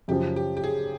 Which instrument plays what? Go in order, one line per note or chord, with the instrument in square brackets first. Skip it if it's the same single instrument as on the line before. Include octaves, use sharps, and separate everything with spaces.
[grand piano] F#2 C#3 F3 [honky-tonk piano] G4
[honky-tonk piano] G4
G4
G#4